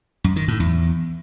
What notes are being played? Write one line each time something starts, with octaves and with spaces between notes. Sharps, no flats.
F#2
D#3
A2
E2